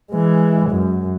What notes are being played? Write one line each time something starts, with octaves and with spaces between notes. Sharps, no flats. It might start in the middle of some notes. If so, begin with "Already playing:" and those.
E3 G#3
F#2